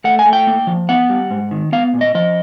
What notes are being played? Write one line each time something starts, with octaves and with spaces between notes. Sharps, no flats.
A3 F#5
G#5
A3
G5
A#3
F3
B3 F#5
G3
G#2
D#3
B3 F5
A#2
D#5
F3 D#5